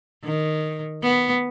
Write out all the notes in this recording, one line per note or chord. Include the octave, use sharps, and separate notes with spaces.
D#3
B3